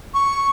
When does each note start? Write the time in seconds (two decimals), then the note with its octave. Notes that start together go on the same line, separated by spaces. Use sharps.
0.14 C#6